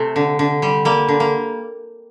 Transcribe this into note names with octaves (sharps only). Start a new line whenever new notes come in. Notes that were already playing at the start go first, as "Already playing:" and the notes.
Already playing: C3 A3
D3
D3
G3
G3 A#3
D3
A#3